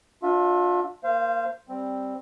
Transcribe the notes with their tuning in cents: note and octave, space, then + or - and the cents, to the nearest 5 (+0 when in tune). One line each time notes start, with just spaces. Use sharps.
D4 +0 F4 +35 E5 +0
A#3 +0 C5 +0 F5 -30
G3 +0 C4 +5